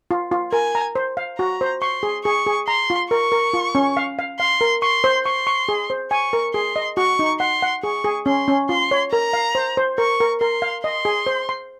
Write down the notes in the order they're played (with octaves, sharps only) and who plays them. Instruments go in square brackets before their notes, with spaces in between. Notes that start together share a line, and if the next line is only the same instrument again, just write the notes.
[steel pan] F4
F4
[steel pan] A#4 [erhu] G#5
[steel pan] A#5
C5
F5
[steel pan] F#4 [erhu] A#5
[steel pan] C5
[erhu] C6 [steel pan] C#6
[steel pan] G#4
[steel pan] G#4 [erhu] C#6
[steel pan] G#4
[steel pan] A#5 [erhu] C6
[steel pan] F4
[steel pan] A#4 [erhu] C#6
[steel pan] A#4
F4
C#4
F5
F5
[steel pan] F5 [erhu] C6
[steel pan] A#4
[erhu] C6 [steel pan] C#6
[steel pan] C5
[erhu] C6 [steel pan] C#6
[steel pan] C#6
G#4
C5
[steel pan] G#5 [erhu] C#6
[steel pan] A#4
[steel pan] G#4 [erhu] C6
[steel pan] D#5
[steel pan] F#4 [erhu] C#6
[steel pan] D#4
[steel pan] F#5 [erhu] C6
[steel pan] F#5
[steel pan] G#4 [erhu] C#6
[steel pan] G#4
[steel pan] C#4 [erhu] C6
[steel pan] C#4
[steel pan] F4 [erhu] C6
[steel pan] C#5
[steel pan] A#4 [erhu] A#5
[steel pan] F5
C5
C5
[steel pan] A#4 [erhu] C#6
[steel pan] A#4
[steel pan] A#4 [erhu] C6
[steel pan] F5
[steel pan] D#5 [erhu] C6
[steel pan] G#4
C5
C6